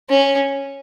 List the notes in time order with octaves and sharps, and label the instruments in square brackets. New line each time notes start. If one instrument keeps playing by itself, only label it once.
[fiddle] C#4